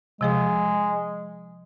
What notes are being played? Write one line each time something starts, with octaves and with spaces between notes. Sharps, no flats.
C3 F3 G#3 G#4